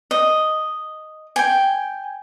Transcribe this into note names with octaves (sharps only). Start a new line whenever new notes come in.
D#5
G5 G#5